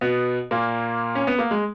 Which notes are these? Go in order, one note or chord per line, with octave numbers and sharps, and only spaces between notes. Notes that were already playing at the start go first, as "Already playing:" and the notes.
B2 B3
A#2 A#3
C#4
B3
A#3
G#3